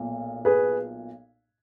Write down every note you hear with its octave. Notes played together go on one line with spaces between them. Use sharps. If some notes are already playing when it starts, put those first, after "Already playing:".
Already playing: B1 A#2
G#4 B4